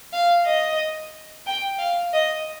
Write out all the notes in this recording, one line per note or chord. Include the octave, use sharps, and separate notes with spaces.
F5
D#5
G5
F5
D#5